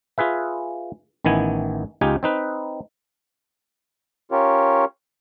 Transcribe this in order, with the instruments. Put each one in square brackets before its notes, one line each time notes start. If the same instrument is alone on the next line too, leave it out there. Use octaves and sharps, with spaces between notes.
[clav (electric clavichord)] F4 G#4 B4 E5
A1 D#3 B3 E4 G#5
C#2 D#4 F4 G4 G#5
C4 D#4 B4
[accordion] C#4 F4 G4 A#4 C#5